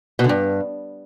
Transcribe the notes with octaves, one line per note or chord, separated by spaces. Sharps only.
B2
D3
G2